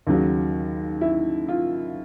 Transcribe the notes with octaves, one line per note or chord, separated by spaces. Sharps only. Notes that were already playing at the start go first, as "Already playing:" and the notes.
D#2 C#3 F#3
E4
F4